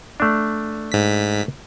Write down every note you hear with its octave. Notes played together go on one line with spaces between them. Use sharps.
A3 D4
G#2 B6